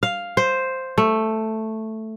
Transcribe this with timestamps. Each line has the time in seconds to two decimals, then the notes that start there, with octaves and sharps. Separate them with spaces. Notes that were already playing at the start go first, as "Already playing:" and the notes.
0.03 F5
0.37 C5
0.98 A3